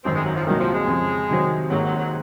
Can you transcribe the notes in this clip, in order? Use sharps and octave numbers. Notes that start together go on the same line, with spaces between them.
G#1 F#2 D#3 C4
G#3
F#3
F3
C2 A#2 D#3 F#3
F3
G#3
F2 C#3 F3
C3 D#3 F#3 C4
G#1 G#2 D#3 F#3 A#3
F#3
F#3